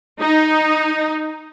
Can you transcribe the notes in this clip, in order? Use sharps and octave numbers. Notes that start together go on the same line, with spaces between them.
D#4